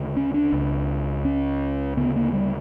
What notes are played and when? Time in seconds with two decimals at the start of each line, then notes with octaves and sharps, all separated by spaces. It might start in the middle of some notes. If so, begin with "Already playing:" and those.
Already playing: D2 C#3
0.17 C#4
0.34 D4
0.52 C#2 C#3
1.25 C#4
1.97 D2 C#3 B3
2.16 A#3
2.33 G3